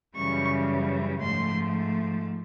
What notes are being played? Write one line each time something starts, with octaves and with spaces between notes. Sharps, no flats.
F#2 C#3 E3 G3 C#6
G#2 F3 A3 C6